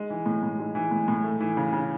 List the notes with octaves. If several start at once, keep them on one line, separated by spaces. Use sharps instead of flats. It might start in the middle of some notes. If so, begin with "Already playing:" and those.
Already playing: G#3
E3
A2
A2
G#3
E3
A2
A2
A3
E3
C#3
C#3